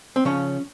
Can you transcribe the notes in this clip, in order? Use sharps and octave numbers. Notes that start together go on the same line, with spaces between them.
C4
C#3 F3 C#4